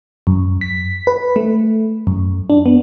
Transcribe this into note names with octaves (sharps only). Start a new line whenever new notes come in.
F#2
B6
B4
A3
F#2
D4
B3